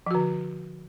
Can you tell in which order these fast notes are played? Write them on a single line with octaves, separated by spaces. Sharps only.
F3 F#4 D3